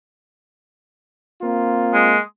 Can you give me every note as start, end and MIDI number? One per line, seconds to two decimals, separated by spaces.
1.42 2.15 58
1.42 2.15 60
1.42 2.15 65
1.94 2.19 56